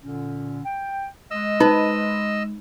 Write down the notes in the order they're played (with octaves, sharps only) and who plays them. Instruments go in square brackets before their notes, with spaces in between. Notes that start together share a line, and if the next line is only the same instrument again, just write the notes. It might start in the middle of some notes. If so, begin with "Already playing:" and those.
[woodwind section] A#2 D3 C#4
G5
[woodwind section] G#3 [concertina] D#5 E6
[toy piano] D#4 [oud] B4